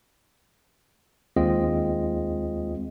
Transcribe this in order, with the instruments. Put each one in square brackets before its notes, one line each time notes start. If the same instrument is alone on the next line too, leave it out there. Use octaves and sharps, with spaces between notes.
[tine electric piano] D#2 G#3 C4 F4 D#5